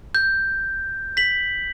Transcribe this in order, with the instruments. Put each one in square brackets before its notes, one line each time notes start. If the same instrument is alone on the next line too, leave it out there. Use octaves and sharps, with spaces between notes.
[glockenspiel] G6
B6 F#7